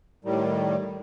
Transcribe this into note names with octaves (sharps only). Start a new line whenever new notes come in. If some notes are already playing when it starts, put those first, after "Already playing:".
A2 D#3 G3